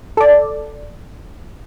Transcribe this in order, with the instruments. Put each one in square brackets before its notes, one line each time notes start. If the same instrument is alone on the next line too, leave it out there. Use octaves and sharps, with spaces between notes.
[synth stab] A4 D5